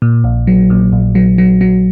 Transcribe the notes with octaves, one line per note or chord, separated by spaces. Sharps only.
A#2
A#1
F#3
A#2
A#1
F#3
F#3
F#3